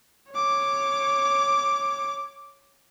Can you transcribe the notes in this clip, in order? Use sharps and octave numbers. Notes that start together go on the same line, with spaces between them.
C#5 D6